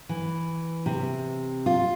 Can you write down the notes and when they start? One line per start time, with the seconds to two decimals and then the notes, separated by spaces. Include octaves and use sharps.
0.09 E3
0.86 C3
1.66 F4